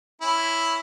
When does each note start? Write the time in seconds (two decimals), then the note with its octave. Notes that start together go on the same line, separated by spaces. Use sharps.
0.22 C#4 E4